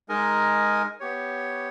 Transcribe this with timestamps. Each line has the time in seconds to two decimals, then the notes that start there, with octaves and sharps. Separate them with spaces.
0.09 G#3 D#4 A#4 D#5 G#5
1.00 B3 G4 C#5